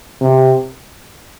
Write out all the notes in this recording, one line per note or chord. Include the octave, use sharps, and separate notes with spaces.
C3